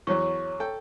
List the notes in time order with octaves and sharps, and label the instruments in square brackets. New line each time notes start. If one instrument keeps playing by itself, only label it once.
[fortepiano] E2 F#3 [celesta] C#5 C#6
[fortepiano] A4 G5